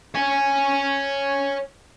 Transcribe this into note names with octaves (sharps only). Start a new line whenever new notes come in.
C#5 G#5